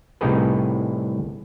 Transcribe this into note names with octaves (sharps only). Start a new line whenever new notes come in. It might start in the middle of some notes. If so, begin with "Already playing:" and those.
C2 A2 D#4 G4 G#4 B4